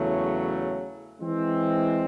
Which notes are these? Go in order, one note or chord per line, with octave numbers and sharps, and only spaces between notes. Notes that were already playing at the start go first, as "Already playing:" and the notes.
Already playing: E2 C#3 F#3 A3
E3 G#3 C4